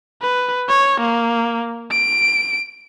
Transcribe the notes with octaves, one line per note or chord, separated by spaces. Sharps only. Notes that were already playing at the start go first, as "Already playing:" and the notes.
B4
C#5
A#3
D7